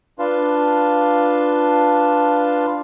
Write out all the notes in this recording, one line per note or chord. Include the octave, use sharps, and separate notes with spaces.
D4 F4 B4 F5 A5 C6